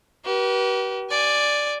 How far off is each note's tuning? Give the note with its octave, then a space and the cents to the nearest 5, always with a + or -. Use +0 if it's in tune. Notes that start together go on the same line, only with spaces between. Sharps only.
G4 -40 B4 -40
D5 +0 G#5 -5